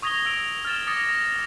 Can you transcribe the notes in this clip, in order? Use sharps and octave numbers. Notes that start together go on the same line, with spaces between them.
C#6 D#6 G#6 A#6 F7 G7
D#6 E6 D7 F7
F6 A6 E7
D6 D#6 F6 A6 A#6 C#7
A#6